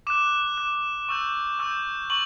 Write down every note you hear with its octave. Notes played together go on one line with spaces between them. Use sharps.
D6 F#6 E7
D6 F#6
C#6 E6 G6
C#6 E6 G6
C#6 F#7